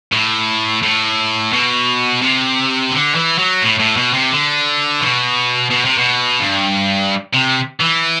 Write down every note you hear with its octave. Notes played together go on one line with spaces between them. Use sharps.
A2
A2
B2
C3
D3
E3
F#3
A2
A2
B2
C3
D3
B2
B2
C3
B2
G2
C3
E3